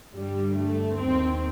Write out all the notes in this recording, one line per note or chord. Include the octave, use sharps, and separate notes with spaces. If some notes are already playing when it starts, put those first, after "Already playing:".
G2 D3 G3
A3
D#2 D#3 C4